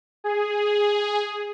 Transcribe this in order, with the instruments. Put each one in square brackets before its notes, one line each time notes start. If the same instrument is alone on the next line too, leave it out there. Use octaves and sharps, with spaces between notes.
[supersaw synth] G#4